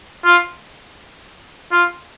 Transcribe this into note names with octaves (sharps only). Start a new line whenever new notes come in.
F4
F4